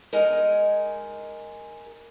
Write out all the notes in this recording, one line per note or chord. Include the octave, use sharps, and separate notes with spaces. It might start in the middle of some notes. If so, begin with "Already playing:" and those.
G#3 D#4 A#4 G#5